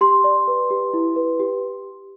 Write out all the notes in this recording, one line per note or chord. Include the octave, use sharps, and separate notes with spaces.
G4 C6
D5
B4
G4
E4
B4
G4